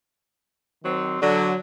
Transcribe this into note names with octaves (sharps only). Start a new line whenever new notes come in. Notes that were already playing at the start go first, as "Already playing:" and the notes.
D#3 F#3 C4
D3 F#3